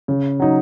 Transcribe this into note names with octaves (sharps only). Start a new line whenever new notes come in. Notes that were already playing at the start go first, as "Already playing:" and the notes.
C#3
F#3 D#4